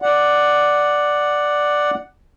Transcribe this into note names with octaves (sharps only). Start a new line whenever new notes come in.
D5 F#5